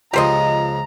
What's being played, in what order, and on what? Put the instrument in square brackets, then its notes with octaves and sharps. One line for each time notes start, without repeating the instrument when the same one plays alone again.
[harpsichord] C#2 F3 [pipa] G4 C5 D#5 [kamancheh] A#5